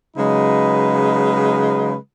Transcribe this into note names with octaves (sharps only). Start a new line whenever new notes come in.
C#3 F#3 G#3 D#4 B4